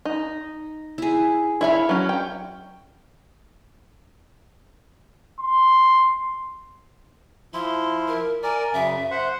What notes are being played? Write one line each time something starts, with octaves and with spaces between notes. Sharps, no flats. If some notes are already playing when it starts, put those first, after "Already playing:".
D#4
E4 G#4
E4 C#5 E5 F5 B5
F#3 C#4
G5
C6
F3 E4 C6
A#4
A#4 D5 G#5
F#2 C#3 E5
C5 F#5